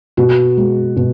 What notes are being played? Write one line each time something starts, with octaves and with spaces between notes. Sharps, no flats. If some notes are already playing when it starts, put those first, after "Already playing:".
B2 F#4
G#3
B2